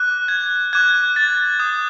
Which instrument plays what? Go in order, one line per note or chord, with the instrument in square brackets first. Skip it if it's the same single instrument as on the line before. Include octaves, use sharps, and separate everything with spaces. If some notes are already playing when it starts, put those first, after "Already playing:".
Already playing: [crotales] D6 F#6
G#6
D6 F#6 G#6
A6
D#6 G6